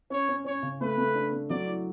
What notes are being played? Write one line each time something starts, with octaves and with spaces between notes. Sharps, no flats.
C#4 C#5
C#4
C#4 C#5
C#3
A3 B4
A3
D4
A3
F#3 D5
E4